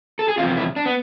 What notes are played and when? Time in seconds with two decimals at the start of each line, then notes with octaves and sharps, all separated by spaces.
0.19 A4
0.28 G#4
0.38 E2 C3 F3 F4
0.57 E4
0.76 D4
0.86 B3